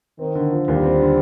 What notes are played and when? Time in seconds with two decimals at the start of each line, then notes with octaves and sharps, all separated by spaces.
0.19 D#3 C4
0.35 D3
0.51 F3
0.68 D#2 G3
0.83 C4
0.99 D3